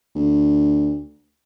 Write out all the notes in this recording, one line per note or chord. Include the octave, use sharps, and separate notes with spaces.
D2